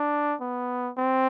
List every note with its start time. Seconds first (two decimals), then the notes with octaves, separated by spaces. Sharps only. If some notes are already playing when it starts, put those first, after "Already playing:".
Already playing: D4
0.41 B3
0.97 C4